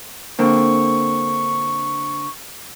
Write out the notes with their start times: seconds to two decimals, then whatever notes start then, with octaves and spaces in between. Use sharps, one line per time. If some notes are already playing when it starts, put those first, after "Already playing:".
0.39 D3 A#3 C4 C#6